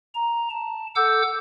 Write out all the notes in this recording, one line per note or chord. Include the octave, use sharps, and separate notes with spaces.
A#5
A5
A4 F#5 D6 E6 G6